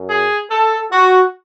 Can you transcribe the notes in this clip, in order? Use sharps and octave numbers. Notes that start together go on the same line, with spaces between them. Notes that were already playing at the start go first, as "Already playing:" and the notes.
Already playing: F#2
G#4
A4
F#4